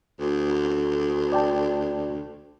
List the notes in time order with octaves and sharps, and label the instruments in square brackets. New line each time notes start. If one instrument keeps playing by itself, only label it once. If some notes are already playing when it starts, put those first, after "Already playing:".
[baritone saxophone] D2
[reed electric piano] D5 G5 A5